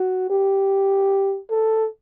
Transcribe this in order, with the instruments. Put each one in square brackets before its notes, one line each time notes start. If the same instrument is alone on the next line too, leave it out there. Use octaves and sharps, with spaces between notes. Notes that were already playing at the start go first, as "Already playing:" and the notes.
Already playing: [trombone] F#4
G4
A4